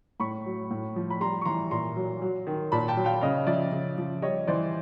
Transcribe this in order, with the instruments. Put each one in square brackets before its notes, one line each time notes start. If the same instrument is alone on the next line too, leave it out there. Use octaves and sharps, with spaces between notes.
[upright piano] A2 B5 C#6
F#3
A2
F3
B5
G3 A#5 C6
C#6
E3 A#5 C6
A#2 A#5 C6
F#3
F#3
D#3
A#2 A5 B5
G5 A5
F#3
F5 G5
C#3 D#5 F5
F3 D5 E5
C#3
F3
G3 C#5 D#5
E3 C5 D5